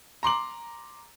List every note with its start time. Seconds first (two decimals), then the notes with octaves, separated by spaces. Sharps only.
0.23 A#5 C6 D6 F#7